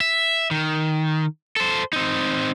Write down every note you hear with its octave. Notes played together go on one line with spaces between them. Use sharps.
E5
D#3
A4 C5
C4 D#4